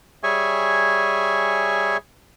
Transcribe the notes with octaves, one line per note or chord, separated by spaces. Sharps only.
G3 G#4 C#5 E5 G#5 C#6